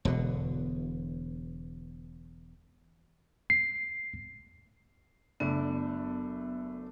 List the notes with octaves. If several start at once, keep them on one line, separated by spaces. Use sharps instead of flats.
E1 B2 D3
C7
F#1 A3 B3 D4 D7